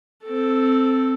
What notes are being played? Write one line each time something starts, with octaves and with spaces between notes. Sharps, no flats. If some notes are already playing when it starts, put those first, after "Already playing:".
C4 A4